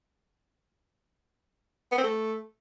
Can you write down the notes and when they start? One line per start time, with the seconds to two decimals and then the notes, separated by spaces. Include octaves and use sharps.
1.92 B3
1.98 C4
2.04 A3